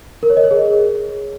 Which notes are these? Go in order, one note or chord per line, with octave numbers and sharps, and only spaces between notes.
A#4
C#5
D#5
C#5
G#4